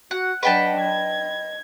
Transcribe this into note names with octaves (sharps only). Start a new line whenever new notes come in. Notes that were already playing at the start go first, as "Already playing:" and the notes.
F#4 F#5
F#3 D4 B4 D#5 F#5 G5 A5
G#6